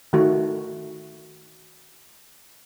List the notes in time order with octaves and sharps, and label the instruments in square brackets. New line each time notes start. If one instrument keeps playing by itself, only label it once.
[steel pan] D#3 A3 F#4